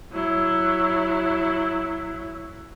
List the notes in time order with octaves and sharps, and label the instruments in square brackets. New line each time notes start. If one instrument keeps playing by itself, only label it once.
[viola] F#3 E4